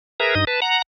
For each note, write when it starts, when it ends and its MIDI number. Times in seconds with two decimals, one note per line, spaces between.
0.20 0.35 68
0.20 0.35 70
0.20 0.35 71
0.20 0.35 76
0.20 0.35 82
0.35 0.45 43
0.35 0.45 63
0.35 0.45 75
0.35 0.45 87
0.47 0.60 71
0.47 0.60 81
0.62 0.82 78
0.62 0.82 82